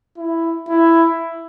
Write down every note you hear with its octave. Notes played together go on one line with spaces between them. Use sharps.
E4
E4